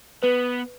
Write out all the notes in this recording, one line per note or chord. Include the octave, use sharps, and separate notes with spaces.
B3 B4